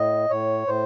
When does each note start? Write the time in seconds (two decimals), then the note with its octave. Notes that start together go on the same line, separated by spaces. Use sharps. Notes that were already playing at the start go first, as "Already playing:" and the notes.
Already playing: A2 D#5
0.30 A2 C#5
0.67 A2 C5